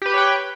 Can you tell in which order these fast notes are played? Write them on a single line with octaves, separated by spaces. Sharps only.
G4 B4 B5 C#5 G5